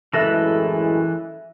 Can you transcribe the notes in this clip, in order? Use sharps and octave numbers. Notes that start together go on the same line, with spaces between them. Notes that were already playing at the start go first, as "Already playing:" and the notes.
F#2 A2 E3 G#3 A4 B4 E5 A#6